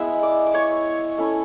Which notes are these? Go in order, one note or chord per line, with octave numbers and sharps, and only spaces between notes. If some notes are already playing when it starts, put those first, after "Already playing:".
Already playing: G#3 B3 E4 E5 E6
D5 D6
D6
C#5 C#6
A3 C#4 E4